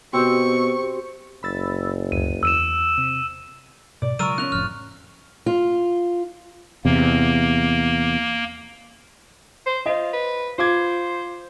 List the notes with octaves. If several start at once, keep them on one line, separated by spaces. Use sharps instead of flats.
B2 C4 F#4 G4 C5 C#6
F#1 B5 E6 A6
D2 G2 D#7
E2 E6 D#7 E7
C3
G#2 B2 D5
C#3 F#3 G#3 F4 A#4 C#6 E6 D#7
C#4 D#4 F#6 F7
F1 A2 F3 F6
F4
E2 C3 A#3
C5
F4 C5 D#5
B4
F4 C5 D6 G#6